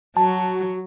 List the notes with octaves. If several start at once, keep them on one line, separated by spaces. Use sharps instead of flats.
F#3 F#4 A5